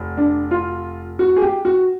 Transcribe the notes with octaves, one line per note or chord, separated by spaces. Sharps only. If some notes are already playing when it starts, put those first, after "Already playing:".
Already playing: F1
D4
F4
F#4
G#4
G4
F#4